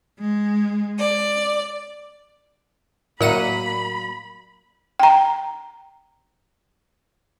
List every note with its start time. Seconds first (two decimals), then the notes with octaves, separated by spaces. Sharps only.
0.18 G#3
0.98 D5
3.21 A2 F#3 A#3 A#4 D5 F#5 B5 D#7
4.99 G5 A#5